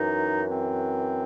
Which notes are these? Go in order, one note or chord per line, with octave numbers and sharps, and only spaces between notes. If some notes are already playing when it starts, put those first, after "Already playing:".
Already playing: F#2 E3 D#4
C4